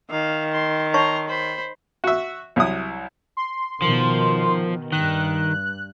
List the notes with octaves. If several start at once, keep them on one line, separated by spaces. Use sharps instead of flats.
D#3 F5
C6
C#5 A5 A#5 C6 C#6
C5 B5
F#4 E5
C2 F#3 E4 D#6
C6
B2 D#3 F3
G2 D#3 F#6